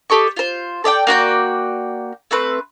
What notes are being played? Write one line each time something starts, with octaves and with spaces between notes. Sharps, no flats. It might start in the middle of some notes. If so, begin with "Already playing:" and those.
G4 A4 D#5 C#6
F4 C5
A4 D5 E5 G5
A#3 F#4 D5 G5
A3 C4 B4